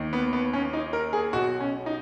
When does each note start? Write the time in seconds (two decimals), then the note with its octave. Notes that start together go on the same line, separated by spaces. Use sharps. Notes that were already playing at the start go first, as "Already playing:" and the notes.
Already playing: D#2 D#3
0.13 B3
0.33 B3
0.53 C#4
0.73 D#4
0.93 A#4
1.13 G#4
1.33 B1 B2 F#4
1.60 C#4
1.86 D#4